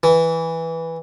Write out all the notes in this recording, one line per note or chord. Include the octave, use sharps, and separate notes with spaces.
E3